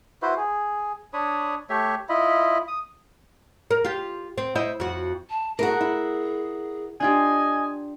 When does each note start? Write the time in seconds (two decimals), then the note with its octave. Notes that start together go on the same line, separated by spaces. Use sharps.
0.22 E4 F#4 B4 C5
0.37 G#4
1.13 D4 C#5 B5 D#6
1.70 A3 G4 C#5 E5
2.09 E4 F4 D#5 B5
2.68 D#6
3.71 A#4
3.85 F4 G4
4.38 C4
4.55 E4 C5 D#5
4.80 F2 F#4
5.30 A5
5.59 A3 E4 F#4 G#4 A#4 F#5
5.81 E4
7.00 D4 F4 G4 D#5 G#5